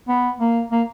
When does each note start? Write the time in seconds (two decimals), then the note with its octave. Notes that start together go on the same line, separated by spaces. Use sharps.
0.08 B3
0.40 A#3
0.72 A#3